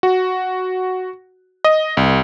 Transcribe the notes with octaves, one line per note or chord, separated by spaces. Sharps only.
F#4
D#5
C2